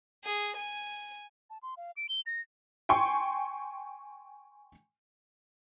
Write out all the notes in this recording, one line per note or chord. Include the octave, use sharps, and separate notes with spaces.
G#4
G#5
A5
C6
F5
D7
G7
A#6
G5 G#5 C6 C#6